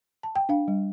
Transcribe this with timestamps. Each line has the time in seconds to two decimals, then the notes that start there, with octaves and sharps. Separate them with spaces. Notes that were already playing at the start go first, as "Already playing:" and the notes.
0.23 A5
0.36 G5
0.49 D4 F5
0.68 G3